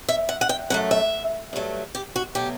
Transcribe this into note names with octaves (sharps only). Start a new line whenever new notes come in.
E5
F#5
F#5
G5
F#2 F#3 A3 F#5
E5
G2 F#3 A3
G4
F#4
B2 F#3 A3 G4